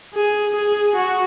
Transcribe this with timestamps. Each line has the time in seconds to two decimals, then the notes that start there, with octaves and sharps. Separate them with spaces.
0.15 G#4
0.55 G#4
0.95 F#4